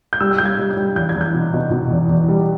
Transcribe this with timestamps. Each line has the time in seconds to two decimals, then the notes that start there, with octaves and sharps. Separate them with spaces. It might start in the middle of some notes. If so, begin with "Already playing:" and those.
0.13 G6
0.21 G3 E6
0.31 E6
0.38 G3 G6
0.45 G#6
0.59 G3
0.71 G6
0.77 G3
0.96 E2 G6
1.09 G#6
1.15 E2
1.21 G6
1.34 B2
1.54 B2
1.71 B2
1.91 E2
2.10 E2
2.28 G3